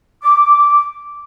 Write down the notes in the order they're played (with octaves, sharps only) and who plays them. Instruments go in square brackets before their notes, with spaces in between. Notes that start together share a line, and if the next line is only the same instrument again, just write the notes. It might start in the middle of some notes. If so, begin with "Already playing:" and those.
[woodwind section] D6